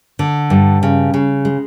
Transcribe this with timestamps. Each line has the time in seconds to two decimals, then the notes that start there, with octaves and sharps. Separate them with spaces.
0.19 D3
0.50 G2
0.83 C#3
1.14 C#3
1.45 G#3